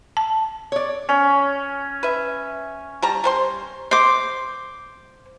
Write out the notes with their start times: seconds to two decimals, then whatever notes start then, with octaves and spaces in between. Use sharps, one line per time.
0.17 A5
0.72 C#5 D5
1.09 C#4
2.03 B4 E5
3.02 G3 A5 A#5
3.24 G3 C5 C6
3.91 C5 D6